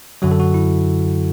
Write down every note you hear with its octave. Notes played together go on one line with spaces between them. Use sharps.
F#2 D3 F#3 F#4
A4
F#4
E4